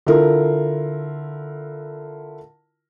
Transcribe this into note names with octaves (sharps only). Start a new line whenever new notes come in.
D3 E4 F4 A#4